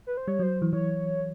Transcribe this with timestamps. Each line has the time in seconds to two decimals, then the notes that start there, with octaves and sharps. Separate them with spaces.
0.07 B4
0.17 C5
0.28 G3 C#5
0.39 F#3 C5
0.62 E3
0.73 E3 C#5